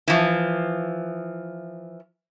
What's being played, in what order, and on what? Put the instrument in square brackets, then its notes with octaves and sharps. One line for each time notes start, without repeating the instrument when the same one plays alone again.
[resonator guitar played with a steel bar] E3 F3